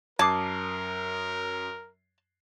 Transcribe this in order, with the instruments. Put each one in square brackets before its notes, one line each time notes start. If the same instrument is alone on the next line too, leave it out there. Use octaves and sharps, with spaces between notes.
[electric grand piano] F#2 D#6 C7 [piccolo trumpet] A#4 [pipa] A5 [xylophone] D6 G#6